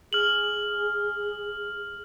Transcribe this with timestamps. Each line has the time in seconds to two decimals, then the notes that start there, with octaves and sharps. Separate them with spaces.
0.13 G#4 F6 F#7